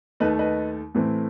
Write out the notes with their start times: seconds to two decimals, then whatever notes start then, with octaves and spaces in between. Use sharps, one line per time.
0.20 D#2 D#3 A3 B4 D#5
0.39 B4 D#5
0.95 A2 E3 A3 C4